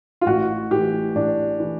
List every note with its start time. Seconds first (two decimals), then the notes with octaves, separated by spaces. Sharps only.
0.21 F4
0.26 A1 F#4
0.71 A2 E3 G4
1.15 A1 D4
1.60 A2 E3